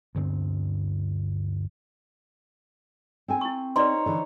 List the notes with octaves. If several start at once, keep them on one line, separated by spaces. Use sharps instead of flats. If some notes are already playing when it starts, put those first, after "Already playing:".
D2 G2 D3 C4
C4 A4 G#5
E4 C#6
D#4 B4 C#5 D5 C6
D3 E3